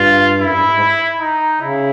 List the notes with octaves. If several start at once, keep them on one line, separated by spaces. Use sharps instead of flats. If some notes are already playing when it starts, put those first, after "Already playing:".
Already playing: G2 F4
F#2 E4
G2
G#2
G#2
D#4
C#3 E4